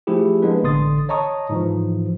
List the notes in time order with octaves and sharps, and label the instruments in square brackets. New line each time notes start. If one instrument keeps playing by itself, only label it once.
[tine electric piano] F3 A3 E4 G4 G#4
G#3 A#3 B3 D4 B4
A1 D3 C6 D#6 A6
C#5 D#5 A5 A#5 C#6 D#6
G#2 E3 F3